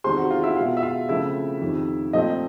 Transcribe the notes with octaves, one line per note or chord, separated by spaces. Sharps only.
E2 C3 D#3 G#3 C5 C6
F#4 F#5
F4 F5
E4 E5
B2 G#3 B3 F4 F5
E5
F4 F5
C#3 F3 A3 C4 E4 E5
F2 C3 D#3
A#2 F3 A3 C4 D#5